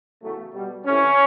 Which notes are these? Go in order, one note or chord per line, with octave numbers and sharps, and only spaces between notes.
E2 C#3 F#3 A3
B2 G3
C3 E3 A3 C#4